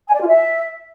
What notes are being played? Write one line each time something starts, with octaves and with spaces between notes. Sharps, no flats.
G#5
D5
F4
E5